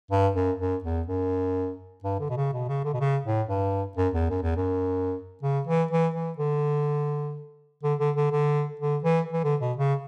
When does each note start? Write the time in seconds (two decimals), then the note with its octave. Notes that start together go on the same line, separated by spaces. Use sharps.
0.11 G2
0.35 F#2
0.59 F#2
0.84 E2
1.07 F#2
2.04 G2
2.20 D3
2.30 B2
2.37 C#3
2.53 B2
2.68 C#3
2.85 D3
2.94 B2
3.00 C#3
3.25 A2
3.48 G2
3.97 F#2
4.14 E2
4.30 F#2
4.42 E2
4.56 F#2
5.43 C#3
5.67 E3
5.91 E3
6.14 E3
6.38 D3
7.83 D3
7.99 D3
8.16 D3
8.31 D3
8.80 D3
9.04 E3
9.33 E3
9.44 D3
9.61 B2
9.77 C#3